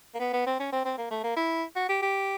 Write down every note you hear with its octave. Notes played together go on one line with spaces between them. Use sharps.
A#3
B3
B3
C4
C#4
C4
C4
A#3
A3
A#3
E4
F#4
G4
G4